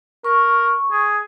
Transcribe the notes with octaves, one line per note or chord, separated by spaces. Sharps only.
A#4 C#6
G#4